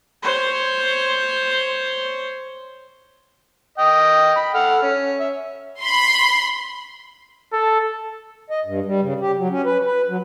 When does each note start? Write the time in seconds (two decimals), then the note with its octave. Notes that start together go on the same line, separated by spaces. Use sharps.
0.23 C5 C#5
3.78 D#5 G5
4.36 B5
4.54 A4 F#5 F6
4.82 C#4
5.20 E5
5.81 B5 C6
7.53 A4
8.50 D#5
8.65 G2
8.86 G3
9.01 C#3
9.20 G4
9.37 F#3
9.50 C#4
9.65 B4
9.85 B4
10.08 F#3